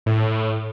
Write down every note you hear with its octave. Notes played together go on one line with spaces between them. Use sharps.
A2